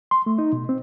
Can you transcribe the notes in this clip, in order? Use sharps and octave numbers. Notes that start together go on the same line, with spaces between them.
C6
A3
D#4
B2
C4